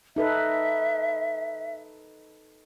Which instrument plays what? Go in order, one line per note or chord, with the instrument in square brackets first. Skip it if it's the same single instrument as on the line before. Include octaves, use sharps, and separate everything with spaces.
[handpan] D#4 A4 B4 [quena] E5